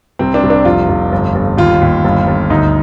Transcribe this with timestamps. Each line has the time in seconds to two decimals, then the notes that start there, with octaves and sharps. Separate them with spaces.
0.19 C2 C4
0.34 D4
0.43 C2
0.50 D4
0.65 F1 F4
0.89 F1
1.12 G1
1.35 G1
1.57 D#2 F4
1.81 D#2
2.04 G1
2.27 G1
2.50 D2 D#4